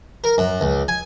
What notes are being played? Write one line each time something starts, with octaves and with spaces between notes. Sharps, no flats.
A#4
F#2
C#2
G#5